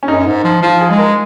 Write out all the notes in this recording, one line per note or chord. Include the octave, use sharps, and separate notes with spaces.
C#4
F#2 D#4
G#2
F3
F3 F4
G#4
G#3
A#4